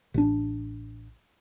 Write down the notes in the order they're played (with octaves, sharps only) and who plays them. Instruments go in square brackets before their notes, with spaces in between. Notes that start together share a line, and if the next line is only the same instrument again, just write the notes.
[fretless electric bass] A1 D4